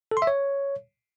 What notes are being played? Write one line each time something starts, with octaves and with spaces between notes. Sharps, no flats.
A4
C6
E5
C#5